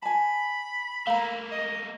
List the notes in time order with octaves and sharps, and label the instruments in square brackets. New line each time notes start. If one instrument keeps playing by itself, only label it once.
[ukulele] G#5 A5 [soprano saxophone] B5
[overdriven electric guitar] A3 A#3 [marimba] F5 A#5
[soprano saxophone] D#5